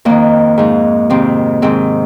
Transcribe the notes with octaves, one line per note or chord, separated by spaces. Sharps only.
F2 D#3 A#3
G#2 F3
F2 C3 D#3 C4
G#2 D#3 C4